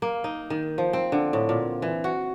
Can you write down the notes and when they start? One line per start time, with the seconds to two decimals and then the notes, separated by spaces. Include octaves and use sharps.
0.02 A#3
0.24 D#4
0.50 D#3
0.78 F3
0.93 C4
1.12 D3
1.33 A2
1.49 A#2
1.82 E3
2.04 F#4